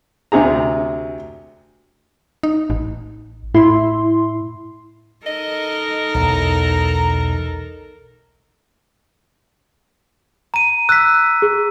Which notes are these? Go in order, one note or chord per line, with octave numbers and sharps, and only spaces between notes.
D2 C3 G#4 A#5
D#4
A1
A2 E4 C6
D#4 A4 A#4 D#5
B1 E2 A#5
A#5 D#7
E6 F#6 B6
G#4